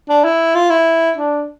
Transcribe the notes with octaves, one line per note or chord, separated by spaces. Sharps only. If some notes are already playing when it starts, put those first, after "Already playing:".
D4
E4
F4
E4
D4